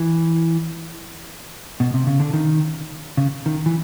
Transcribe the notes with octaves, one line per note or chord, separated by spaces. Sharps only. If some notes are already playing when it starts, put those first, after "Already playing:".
Already playing: E3
B2
C3
C#3
D3
D#3
C#3
D#3
E3